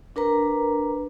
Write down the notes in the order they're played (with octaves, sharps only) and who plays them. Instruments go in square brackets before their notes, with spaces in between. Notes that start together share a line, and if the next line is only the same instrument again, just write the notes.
[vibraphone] D4 A#4 B4 A#5